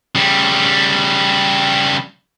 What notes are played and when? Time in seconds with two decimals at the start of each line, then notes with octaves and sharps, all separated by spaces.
0.15 C#3 G3